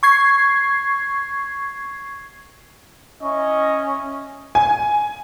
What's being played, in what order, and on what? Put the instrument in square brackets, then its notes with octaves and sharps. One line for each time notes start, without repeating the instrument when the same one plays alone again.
[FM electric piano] C#6 G#6 C7
[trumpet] C#4 [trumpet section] E4 D#5 C#6
[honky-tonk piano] G#5